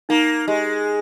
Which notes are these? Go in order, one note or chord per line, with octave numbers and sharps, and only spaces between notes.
A#3 D#4
G#3 G4